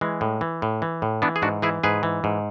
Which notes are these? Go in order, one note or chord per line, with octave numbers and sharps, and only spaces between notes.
E3 G#3
A2
E3
A2
E3
A2
E3 B3 D4
G#4
G#2 D4 F#4
E3 E4 G#4
G#2 G#4 B4
E3
G#2